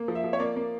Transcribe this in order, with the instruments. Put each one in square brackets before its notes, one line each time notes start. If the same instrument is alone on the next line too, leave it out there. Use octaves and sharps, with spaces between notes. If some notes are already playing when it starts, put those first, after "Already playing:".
Already playing: [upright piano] A#3
F3
E5
F3
C#5
A#3 D5
A#3